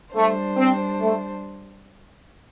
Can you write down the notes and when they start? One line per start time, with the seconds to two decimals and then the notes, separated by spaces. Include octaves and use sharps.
0.15 G3 A3 D4 C5
0.57 C4
0.99 A3